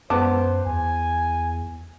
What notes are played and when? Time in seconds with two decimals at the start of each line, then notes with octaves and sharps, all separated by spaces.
0.10 F#2 B3 C5 A5 D6
0.66 E2 G#5